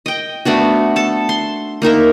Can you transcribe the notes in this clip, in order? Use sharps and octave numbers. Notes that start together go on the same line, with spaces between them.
D#5 G5
A3 B3 D4 F#4
A4 A5
C6
A#3 D#4 A#4 E5